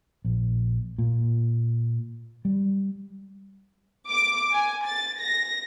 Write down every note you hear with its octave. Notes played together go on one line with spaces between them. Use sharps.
A#1
A#2
G3
D6
G#5
A6
A#6